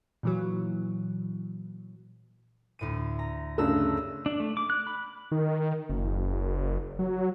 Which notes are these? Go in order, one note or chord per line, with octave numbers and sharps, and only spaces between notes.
A#2 E3 F#3
D2 A2 D#7
A#5
G2 C#3 A3 A#5 E6 F#6
D4
A3
D6
F#6
B5
D#3
F#1
F#3